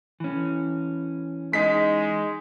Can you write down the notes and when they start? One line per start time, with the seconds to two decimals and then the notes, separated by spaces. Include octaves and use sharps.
0.20 E3 C#4
1.53 G#3 D#4 B6